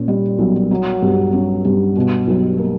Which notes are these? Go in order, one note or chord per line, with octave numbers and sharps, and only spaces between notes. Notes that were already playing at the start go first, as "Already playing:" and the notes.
Already playing: A#2 C#4
G3
B1
F#3
G2
C#4
G2
B2
B1
A#3